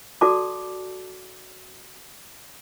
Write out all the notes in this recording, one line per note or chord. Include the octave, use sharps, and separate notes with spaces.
F#4 A4 D5 A5 D6